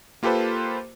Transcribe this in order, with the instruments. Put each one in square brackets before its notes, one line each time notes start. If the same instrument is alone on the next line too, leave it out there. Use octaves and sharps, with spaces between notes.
[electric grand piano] A#3 F4 G4 A4 B4 C5